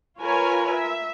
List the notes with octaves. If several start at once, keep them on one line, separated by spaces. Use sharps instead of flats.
F4 A#4 B4 C#5 G#5
E5